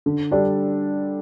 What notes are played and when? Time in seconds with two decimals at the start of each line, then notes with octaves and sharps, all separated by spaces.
0.06 D3
0.31 G3 D4 A4 D5